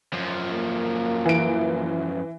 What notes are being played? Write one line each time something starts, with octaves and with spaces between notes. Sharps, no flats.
F#2 F3
A#3
E3 D7